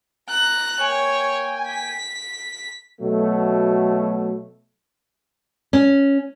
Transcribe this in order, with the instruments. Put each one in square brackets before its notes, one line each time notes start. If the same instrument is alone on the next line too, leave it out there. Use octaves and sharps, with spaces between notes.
[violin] A#5 F#6
[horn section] A#3 G5 G#5 [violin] C#5
[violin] B6
[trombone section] B2 F#3 A3
[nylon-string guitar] C#4